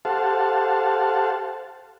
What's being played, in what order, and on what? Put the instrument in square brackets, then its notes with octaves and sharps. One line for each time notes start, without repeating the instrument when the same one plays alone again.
[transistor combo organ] G4 A4 C5 F5 F#5 A5